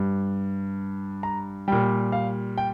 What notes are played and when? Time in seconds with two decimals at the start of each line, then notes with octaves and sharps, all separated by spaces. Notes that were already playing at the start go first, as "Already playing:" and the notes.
Already playing: G2 G3
1.23 A#5
1.68 A#2 G3 G5
2.12 F5
2.58 G5